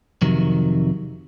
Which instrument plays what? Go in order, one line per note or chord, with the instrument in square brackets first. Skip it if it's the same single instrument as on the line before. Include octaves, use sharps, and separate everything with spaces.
[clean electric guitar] F2 C3 D#3 F#3